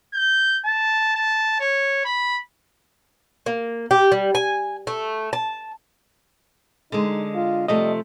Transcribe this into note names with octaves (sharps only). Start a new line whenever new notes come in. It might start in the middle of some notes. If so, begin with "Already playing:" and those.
G6
A5
A5
C#5
B5
A#3
G4
G3
G#5
A3
A5
D3 G#3 D#4
F4
C3 F3 G3 A3 D#5